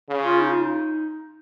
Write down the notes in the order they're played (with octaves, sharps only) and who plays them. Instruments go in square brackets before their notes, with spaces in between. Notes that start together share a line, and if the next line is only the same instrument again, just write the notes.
[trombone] C#3
[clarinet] F4
D#4
F4
D#4